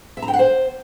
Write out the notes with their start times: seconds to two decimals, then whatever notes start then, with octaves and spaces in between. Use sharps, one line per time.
0.17 E5
0.22 A#5
0.28 G5
0.33 F#5
0.39 C5